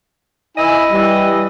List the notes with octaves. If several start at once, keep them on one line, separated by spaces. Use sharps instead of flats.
E4 D#5 G#5
E3 G3